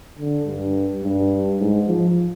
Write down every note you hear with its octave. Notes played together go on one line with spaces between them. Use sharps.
D3
G2
G2
G#2
F3